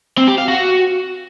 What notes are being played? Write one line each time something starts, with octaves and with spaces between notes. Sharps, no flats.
C4
G4
F5
F#4